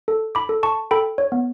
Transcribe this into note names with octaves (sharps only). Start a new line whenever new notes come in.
A4
B5 D6
A4
A5 C#6
A4 G5 B5
C#5
B3